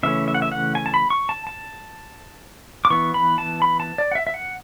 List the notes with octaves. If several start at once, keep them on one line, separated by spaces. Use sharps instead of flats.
C#3 E3 A3 C#4 E5
E5
F#5
E5
F#5
G#5
A5
B5
C#6
A5
A5
D6
E3 B3 C#6
B5
A5
B5
A5
D5
F#5
E5
E5
F#5